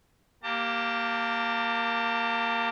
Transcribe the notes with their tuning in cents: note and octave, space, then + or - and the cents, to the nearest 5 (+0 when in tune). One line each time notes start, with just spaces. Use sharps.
A#3 +0 G4 +0 A5 +35